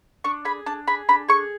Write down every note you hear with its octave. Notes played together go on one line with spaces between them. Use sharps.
D4 C#6
G#4 B5
D4 A5
G#4 B5
D4 B5
G#4 C#6